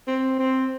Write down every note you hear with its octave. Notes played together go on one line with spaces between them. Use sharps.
C4
C4